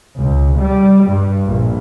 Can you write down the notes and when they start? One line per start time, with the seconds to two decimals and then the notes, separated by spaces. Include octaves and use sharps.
0.18 C#2
0.59 G3
1.11 G2
1.47 A#1